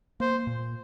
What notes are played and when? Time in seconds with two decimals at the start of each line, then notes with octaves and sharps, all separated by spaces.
0.20 A#3 C5
0.47 A#2